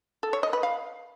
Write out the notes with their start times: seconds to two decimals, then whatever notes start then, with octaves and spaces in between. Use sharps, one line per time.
0.23 A4
0.33 C#5
0.43 D#5
0.53 B4
0.63 F5